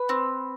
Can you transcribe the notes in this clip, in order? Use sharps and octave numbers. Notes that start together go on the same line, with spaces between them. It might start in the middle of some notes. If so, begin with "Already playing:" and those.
Already playing: B4
C4